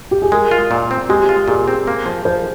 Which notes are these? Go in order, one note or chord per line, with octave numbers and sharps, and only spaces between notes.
G4
G#4
G#3 A#4
F4
A#2
C4
G#3 G4
F4
A#2 G#4
C4
A#3
F3
F3 C5